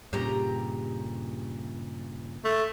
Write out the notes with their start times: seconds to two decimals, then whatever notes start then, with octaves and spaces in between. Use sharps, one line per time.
0.13 G2 A#2 C#3 G4 A#5
2.45 A3